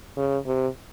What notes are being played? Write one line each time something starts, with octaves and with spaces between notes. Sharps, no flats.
C#3
C3